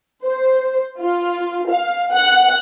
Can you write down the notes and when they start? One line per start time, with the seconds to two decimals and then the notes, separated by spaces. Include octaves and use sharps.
0.24 C5
1.01 F4
1.70 F5
2.12 F#5